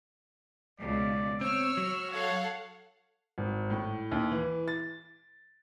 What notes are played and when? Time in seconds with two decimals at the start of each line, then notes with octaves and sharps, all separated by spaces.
0.80 C#2 B2 D5
1.41 C4 C#5 E6 F6
1.77 F#3
2.12 A4 C#5 F5 F#5
3.38 G#1
3.70 A2
4.11 D#2
4.31 E3
4.68 A6